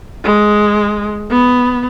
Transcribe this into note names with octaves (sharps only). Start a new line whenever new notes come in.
G#3
B3